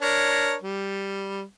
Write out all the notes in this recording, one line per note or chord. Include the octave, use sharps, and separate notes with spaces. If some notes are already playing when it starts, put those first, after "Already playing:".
D4 A#4 C#5
G3